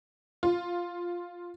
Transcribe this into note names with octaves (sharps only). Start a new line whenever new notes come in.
F4